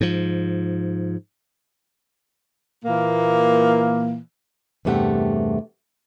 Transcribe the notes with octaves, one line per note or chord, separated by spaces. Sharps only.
G#2 F3
A#2 E3 A#3
E2 G2 C3 A3 G4 F#5